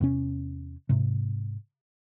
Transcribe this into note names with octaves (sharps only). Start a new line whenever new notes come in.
E2 C3 C#4
G#2 C3